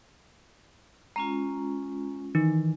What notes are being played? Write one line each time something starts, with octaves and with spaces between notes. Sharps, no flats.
G#3 C#4 F4 A#5
D#3 E3 D#4